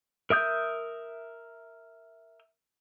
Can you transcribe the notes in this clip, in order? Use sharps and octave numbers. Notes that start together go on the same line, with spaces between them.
A#4 E5 D#6 G6